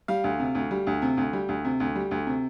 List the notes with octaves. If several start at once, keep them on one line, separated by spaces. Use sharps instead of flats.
G3 F5
D2
C3
D2
G3
D2
C3
D2
G3
D2
C3
D2
G3
D2
C3